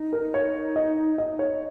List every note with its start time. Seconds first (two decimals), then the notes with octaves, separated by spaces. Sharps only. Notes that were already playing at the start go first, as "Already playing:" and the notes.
Already playing: D#4
0.13 A#4
0.34 C#5
0.76 D#5
1.18 D#5
1.39 C#5